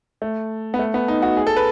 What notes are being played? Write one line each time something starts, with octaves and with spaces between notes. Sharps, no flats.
A3
B3
A3
B3
D#4
F#4
G#4
A4
B4